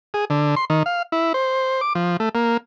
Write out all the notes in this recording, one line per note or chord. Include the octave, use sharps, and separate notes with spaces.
G#4
D3
C6
D#3
F5
E4
C5
D6
F3
A3
A#3